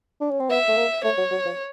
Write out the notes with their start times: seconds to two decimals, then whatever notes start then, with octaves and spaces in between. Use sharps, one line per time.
0.21 D4
0.31 C#4
0.40 C4
0.50 B3 E5
0.68 A3
0.77 A#3
1.04 A3 C#5
1.18 F#3
1.32 F#3
1.45 F3